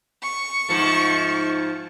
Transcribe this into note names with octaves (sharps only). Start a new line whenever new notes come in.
C#6
G#2 F3 A3